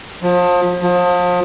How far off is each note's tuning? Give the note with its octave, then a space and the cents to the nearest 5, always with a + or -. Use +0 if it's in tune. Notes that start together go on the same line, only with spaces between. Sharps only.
F3 +35
F3 +35